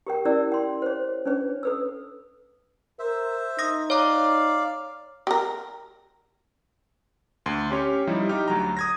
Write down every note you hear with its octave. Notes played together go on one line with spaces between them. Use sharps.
G4 A#4 G5
C#4 E4 G4 A#4 D5 E6
G5 C6
C5 C#5
C#4 D4 B4 C#5
A4 B4 E6
A#4 C5 E5
D#4 D#6 A#6
C#5 D5 F5 A#5
G4 A#4
D2 C6 C7
C#4 G4 C#5
F3 G3 D#4 E4
D#4 G4 F6
D2 F#3 A#5
D#6 G#6 A#6